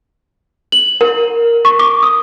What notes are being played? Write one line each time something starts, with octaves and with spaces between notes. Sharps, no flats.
F#7
A#4
C#6
D6
D#6